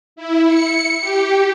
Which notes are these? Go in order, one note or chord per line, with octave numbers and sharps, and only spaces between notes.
E4
C#7
G4